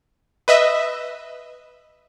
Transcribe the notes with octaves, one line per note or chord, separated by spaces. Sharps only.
B4 D#5 E5